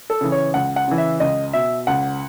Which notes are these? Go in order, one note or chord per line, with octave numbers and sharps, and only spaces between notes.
A4
C#3 E3
C#5
C#2 F#5
F#5
C#3 E3
E5
C#2 D#5
B2 E5
C#2 F#5